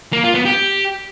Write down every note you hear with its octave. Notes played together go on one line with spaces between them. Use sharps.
A#3
F4
B3
G4